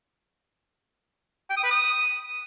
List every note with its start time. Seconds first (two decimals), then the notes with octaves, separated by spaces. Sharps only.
1.50 G5
1.57 D#6
1.64 B4
1.71 D#6